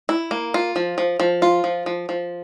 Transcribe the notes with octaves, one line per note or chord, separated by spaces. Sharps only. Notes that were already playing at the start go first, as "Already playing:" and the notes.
E4
A#3
F4
F3
F3
F3
F4
F3
F3
F3